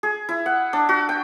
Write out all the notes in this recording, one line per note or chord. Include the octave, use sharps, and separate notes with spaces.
G#4
E4
F#5
D4
F#4
G5